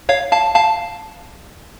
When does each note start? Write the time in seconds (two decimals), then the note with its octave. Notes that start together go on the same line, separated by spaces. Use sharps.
0.09 C#5 F5
0.32 F5 A5
0.55 F5 A5